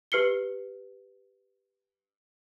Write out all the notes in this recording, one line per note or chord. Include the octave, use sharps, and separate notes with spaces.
G4 B4 F6 C7 C#7 G7